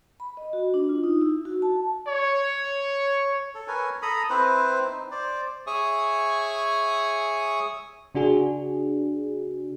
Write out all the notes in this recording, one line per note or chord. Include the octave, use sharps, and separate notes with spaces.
B5
D#5
F#4
D4
F4
D#4
E4
F#4
A5
C#5
A4
A#4 B4 C#5 G#5
A4 A#5 B5 D#6
C4 E4 B4 C5
D#4
C5 D5
G#4 C#5 E5 G#5 C#6 D#6
C#3 D4 F#4 G#4